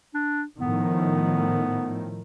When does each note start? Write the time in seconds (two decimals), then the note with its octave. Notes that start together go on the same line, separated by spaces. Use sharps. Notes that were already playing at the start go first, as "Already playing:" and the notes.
0.14 D4
0.59 A2 D#3 F3 B3